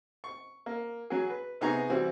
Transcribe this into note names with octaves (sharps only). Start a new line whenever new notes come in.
C#6
A#3
F#3 F#4 G#4
B4
C3 B3 D#4 G#4 A#5 C#6
E3 G3 C4 F#4